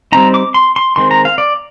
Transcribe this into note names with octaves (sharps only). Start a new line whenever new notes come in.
G3 C4 D#4 A#5
D6
C6
C6
D#3 G#3 C4 C6
A#5
F5
D5